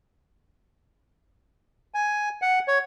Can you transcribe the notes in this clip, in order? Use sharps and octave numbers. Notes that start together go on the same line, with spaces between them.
G#5
F#5
C#5